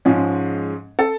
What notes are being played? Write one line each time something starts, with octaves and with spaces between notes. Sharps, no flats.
G#2 F3 G#3 C#4 G#4
A4